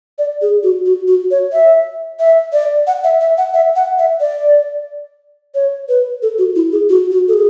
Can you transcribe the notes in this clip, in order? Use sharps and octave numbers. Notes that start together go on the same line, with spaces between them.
D5
G#4
F#4
F#4
F#4
C#5
E5
E5
D5
F#5
E5
E5
F#5
E5
F#5
E5
D5
C#5
B4
A4
F#4
E4
G#4
F#4
F#4
A4
G#4